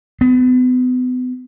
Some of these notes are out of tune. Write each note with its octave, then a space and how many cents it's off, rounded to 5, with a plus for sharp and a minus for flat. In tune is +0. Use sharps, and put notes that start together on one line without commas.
B3 +35